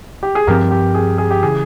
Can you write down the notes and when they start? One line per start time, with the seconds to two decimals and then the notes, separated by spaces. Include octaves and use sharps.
0.23 G4
0.35 G#4
0.47 G2 F3 C4 G4 A#4
0.71 G4
0.95 G#4
1.18 G#4
1.31 G4
1.43 C#3 E3 G#4